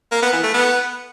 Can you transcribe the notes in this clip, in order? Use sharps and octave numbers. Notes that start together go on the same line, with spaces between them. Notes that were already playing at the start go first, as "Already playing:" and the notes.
A#3
B3
E3
A3
B3